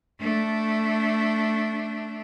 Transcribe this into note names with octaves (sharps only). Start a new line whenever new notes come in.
A3 D4